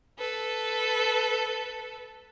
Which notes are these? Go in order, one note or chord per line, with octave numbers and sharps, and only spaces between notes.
A4 B4